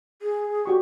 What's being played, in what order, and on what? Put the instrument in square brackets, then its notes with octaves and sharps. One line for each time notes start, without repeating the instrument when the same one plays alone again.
[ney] G#4
[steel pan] F#4 G4 C#6